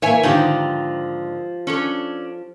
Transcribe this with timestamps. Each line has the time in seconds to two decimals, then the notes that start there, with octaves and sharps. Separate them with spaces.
0.02 E3 A#3 C#5 E5 G#5
0.23 G#2 D3 D#3 F3 G4
1.67 C#4 D4 A4